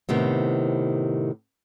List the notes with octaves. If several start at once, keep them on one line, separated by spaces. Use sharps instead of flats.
A2 C3 D#3 B3